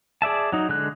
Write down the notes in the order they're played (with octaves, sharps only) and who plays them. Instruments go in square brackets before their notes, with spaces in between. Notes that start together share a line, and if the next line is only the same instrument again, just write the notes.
[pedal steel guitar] G#4 D5 E5 A5
F#3 D#4
D3 G#3 F#6